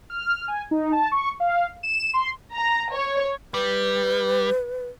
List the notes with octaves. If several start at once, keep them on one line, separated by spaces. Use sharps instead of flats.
F6
G#5
D#4
A5
C#6
F5
E7
C6
A#5
C#5
G3 B4